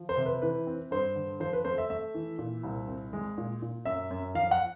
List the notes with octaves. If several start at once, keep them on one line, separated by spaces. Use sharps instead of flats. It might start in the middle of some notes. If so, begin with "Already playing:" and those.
Already playing: F3
C5
C3
B4
E3 B4
C4
G2 C5
D3
F3 C5
B4
A3 C5
E5
A3 E5
E3
A#2
C2
C4
G#3
A#2
A#2
F#2 E5
F#2
F3 F5
F#5